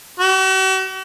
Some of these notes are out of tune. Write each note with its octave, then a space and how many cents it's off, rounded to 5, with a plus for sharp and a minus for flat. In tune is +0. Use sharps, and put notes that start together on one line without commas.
F#4 +45